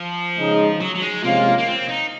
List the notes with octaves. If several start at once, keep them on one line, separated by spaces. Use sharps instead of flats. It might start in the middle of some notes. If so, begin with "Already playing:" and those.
Already playing: F3
C#3 G#3 D#4
F#3
F#3
G#3
C3 F3 G#3 A#3 C#4 F4
A#3
C4
D#4